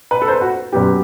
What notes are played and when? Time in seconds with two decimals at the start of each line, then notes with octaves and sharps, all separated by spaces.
0.11 B4
0.22 A4
0.28 C5
0.31 B4
0.42 F#4
0.73 F#2 F#3 B3 G4